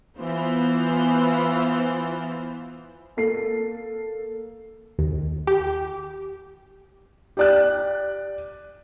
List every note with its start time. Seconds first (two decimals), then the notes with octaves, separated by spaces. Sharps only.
0.17 E3 B3 F4 C5
3.17 A#3 A4 C7
4.98 D#2
5.47 G4
7.37 G4 D5 F#6